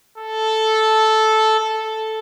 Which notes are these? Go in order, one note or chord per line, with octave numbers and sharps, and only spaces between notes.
A4
A4